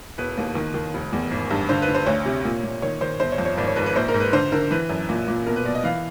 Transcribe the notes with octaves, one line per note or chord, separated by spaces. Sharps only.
E1 B4
D#2
D#3
D#3
F1
E2
G#1
G2
D3 C5
B4
D3
C5
D2 C#5
C3
A#2
A#2
D#3 C#5
D#3 C5
G1 C5
C#5
F2
C#5
G#1 D5
C#5
G#2 B4
B4
A#1 C5
A#4
G#2
B4
D3 C5
D3 A#4
E3 B4
F#2
A#2
A#2
B2 A#4
B4
B2 D5
D#5
E3 F5